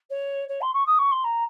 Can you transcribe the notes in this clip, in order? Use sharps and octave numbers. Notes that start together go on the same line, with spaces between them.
C#5
C#5
C6
C#6
D#6
C#6
C6
A#5